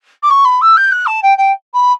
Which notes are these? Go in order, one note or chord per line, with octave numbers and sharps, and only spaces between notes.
D6
C#6
B5
E6
G6
F#6
A5
G5
G5
B5